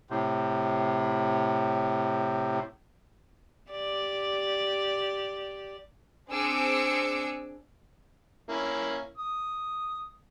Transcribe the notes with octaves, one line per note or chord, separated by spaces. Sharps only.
A2 C3
G4 D5
C4 D4 G#4 D6 E6 C#7
A#3 C#4 E4
D#6